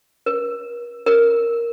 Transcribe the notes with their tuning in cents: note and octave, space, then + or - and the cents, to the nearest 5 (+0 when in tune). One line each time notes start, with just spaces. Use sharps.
A#4 +45
A#4 +0